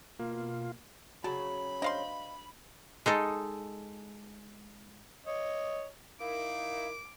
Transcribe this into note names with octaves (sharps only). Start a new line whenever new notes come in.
B2 A#3 F4
C#3 F#3 F#4 A5 B5
D4 C5 D#5 F5 C6
G#3 D#4 A4
C#5 D#5
D#4 E4 A#4 F5 D6